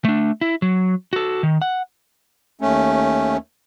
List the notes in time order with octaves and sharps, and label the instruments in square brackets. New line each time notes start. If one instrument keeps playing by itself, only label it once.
[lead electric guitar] A3 D4
E4
F#3
F#4 A4
D#3
F#5
[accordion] D#2 A3 C#4